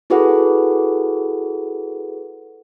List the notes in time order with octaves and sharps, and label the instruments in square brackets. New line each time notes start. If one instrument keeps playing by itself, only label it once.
[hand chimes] E4 F#4 G#4 A4 B4 F#5